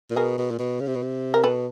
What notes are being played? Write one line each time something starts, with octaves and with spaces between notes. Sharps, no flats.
A#2
B2 G#4 A#4
B2
A#2
B2
C#3
C3
B2
C3
A#4
B2 A4 B4